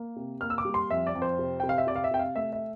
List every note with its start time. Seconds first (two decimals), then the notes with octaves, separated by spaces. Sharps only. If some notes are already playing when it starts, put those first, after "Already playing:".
Already playing: A#3
0.16 C3
0.41 A#3 F6
0.50 E6
0.58 D6
0.65 G3
0.74 C6
0.90 F2 E5
1.07 D5
1.15 F2
1.22 C5
1.39 C3
1.60 C3 G5
1.69 F5
1.78 E5
1.87 C3 D5
1.96 F5
2.04 E5
2.11 C3 G5
2.19 F5
2.36 A3 E5
2.53 E5